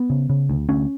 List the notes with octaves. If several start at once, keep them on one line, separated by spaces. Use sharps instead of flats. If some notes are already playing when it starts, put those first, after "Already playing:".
Already playing: B3
C#3
C#3
D2
D2 C#4